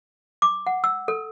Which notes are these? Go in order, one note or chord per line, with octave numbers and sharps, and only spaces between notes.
D6
F#5
E6
A4